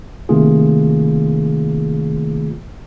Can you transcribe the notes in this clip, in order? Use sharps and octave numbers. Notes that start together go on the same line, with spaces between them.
C3 D#3 A3 A#3 F4 G#4